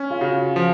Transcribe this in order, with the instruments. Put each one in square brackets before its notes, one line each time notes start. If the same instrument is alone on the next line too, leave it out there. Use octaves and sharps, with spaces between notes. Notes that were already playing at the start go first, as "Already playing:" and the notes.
Already playing: [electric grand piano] C#4
[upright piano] F4
[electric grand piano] C#3 [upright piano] F#4
[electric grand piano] F3